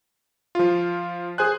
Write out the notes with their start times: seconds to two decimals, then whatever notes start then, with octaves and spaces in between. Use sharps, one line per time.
0.55 F3 F4
1.38 G#4 C5 G#5 F#6